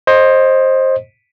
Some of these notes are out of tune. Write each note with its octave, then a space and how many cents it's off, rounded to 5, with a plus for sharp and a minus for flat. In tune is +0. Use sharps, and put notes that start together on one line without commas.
C5 +15 D#5 +0